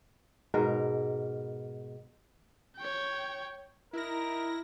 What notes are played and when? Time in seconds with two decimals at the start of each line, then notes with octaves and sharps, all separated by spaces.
0.54 G#2 B2 A#4 F5
2.77 C#5 G5
3.93 D#4 E4 A#4 A#6